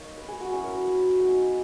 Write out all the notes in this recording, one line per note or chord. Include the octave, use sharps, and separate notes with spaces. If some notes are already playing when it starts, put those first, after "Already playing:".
Already playing: A#3 D#4 C#5
B4
G#4
F#4
F#3 C#4 E4 G#4
A#4
B4
C#5
G#3 B3 D#4